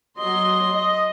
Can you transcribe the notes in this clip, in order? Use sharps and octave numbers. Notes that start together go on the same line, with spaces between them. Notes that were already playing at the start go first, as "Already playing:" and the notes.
F#3 D#5 C6
D#5